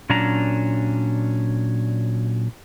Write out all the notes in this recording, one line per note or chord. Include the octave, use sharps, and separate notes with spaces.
A#2 F#3 C#4 D4 A#5